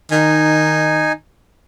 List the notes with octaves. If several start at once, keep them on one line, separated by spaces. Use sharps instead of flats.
D#3 D#4 G#5